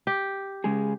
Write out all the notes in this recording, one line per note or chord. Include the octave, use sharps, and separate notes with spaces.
G4
C#3 G#3 G#4